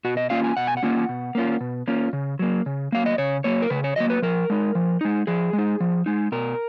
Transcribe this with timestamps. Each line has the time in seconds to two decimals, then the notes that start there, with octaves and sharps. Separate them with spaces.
0.05 B2 F#4
0.17 D#5
0.30 A#3 C#4 F4 F5
0.44 G#5
0.57 B2 F#5
0.67 G#5
0.77 F#5
0.83 A#3 C#4 F4
1.09 B2
1.35 A#3 C#4 F4
1.61 B2
1.88 A#3 C#4 F4
2.13 C#3
2.39 F#3 A#3
2.66 C#3
2.92 F#3 A#3 F5
3.06 D#5
3.18 C#3 C#5
3.44 F#3 A#3 C#5
3.62 A#4
3.70 C#3 B4
3.84 C#5
3.96 F#3 A#3 D#5
4.10 B4
4.22 F3 A#4
4.50 G#3 D#4
4.75 F3
5.01 G#3 D#4
5.27 F3 G#4
5.53 G#3
5.58 D#4
5.80 F3
6.06 G#3 D#4
6.32 B2 A#4